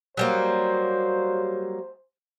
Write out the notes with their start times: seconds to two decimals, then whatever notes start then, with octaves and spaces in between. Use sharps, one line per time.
0.17 F#3 G3 A#3 C5